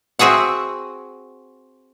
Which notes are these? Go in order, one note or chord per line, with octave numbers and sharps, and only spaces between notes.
C4 F#4 G#4 E5 F#5